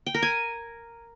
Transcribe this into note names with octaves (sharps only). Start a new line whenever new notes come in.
G5
A#4
G#5